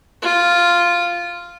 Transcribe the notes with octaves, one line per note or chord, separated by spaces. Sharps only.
F4